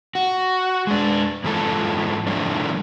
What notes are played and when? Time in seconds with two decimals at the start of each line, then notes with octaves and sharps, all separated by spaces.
0.15 F#4
0.87 G#3 D4
1.44 G#2 E3 F3 E4 F4 A4
2.27 A2 F3 G3 A3 D4 D5